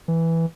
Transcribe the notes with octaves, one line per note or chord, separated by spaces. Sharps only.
E3